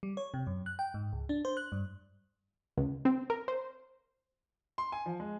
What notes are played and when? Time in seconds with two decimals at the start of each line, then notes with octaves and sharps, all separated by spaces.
0.03 G3
0.17 C#5
0.34 C3
0.47 F#2
0.66 F#6
0.79 G5
0.94 G#2
1.13 C#2
1.29 D4
1.45 C5
1.57 F#6
1.72 G2
2.77 C#2
3.05 C4
3.30 A#4
3.48 C5
4.78 C6
4.92 G#5
5.06 F3
5.20 G#3